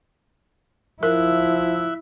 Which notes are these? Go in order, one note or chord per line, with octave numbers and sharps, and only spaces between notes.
F3 E4 A#4 E5 F#6